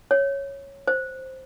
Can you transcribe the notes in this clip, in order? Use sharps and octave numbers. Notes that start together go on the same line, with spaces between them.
C#5
C5